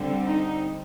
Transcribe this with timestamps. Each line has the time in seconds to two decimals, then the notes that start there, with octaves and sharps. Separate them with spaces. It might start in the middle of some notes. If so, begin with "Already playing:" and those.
Already playing: D3 G3 C4
0.27 D#4